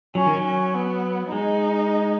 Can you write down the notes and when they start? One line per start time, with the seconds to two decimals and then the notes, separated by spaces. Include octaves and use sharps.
0.15 F#3 C#4
0.26 D#3
0.37 F#3
0.45 C#4
0.74 B3
1.32 G#3 D#4